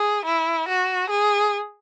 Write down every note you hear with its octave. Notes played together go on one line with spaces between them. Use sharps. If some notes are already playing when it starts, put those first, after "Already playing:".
Already playing: G#4
E4
F#4
G#4